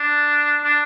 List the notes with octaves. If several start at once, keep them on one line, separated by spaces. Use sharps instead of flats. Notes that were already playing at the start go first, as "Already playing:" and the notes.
Already playing: D4
D4